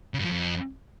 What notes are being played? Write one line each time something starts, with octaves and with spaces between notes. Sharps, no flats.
C#3
G2
F3
F2